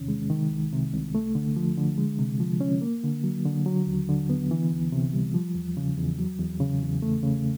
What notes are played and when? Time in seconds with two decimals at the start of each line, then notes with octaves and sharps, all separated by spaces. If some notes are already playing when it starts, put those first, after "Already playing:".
Already playing: E2 C3 D#3 C#4
0.08 G#3
0.30 D#3
0.51 C2
0.72 C3
0.93 C2
1.15 A3
1.35 D3
1.56 F3
1.77 D3
1.98 G#3
2.19 C3
2.40 F3
2.61 C#4
2.82 A#3
3.04 D3
3.24 F#3
3.45 D3
3.66 F#3
3.87 D#2
4.09 D3
4.30 B3
4.51 E3
4.72 C#2
4.92 C3
5.14 G3
5.34 F3
5.55 E2
5.77 C#3
5.98 E2
6.19 F#3
6.39 E2
6.60 C#3
6.82 E2
7.02 A3
7.23 C#3